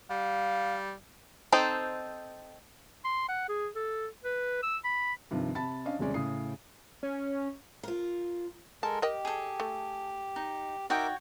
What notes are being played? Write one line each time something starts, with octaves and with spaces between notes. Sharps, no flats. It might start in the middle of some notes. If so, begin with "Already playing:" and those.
G3 F5
C4 D#4 A4 C5
C6
F#5
G#4
A4
B4
E6
B5
G2 C3 D#3 F3
C3 A5 B5 A6
C#4 D4 D#5 F5
D#1 C3 G#3 C#4 D5
A2 C#3 D#6 C7
C#4
F4 A#4
G#3 A4 A#4 A5
G4 A#4 D#5 G5
G#4 A4
A3
D#4
D#4 F#4 A#4 C#5 E5 G5 D6